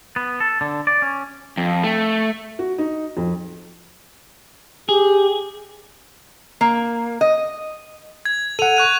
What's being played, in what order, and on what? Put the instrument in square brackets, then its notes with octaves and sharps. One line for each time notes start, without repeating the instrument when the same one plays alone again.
[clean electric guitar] B3
A4
D3
D5
C#4
[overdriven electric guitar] F2
A3
[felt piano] F#4
D#4
F2
[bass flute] G4 [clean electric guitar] G#4
[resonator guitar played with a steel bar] A#3
D#5
[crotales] G#6
[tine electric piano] A4 F#5 [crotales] D#7 F7
[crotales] C#6 F#6 D#7